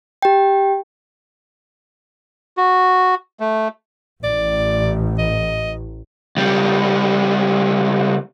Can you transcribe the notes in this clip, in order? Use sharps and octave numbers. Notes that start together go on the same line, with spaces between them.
G4 G5
F#4
A3
A1 D5
D#5
C#2 G3